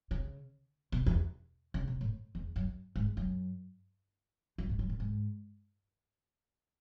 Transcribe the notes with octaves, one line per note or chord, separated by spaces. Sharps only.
C#3
B2
E2
C#3
B2
A2
E2
F#2
G#2
F#2
F#2
G#2
F#2
A2
G#2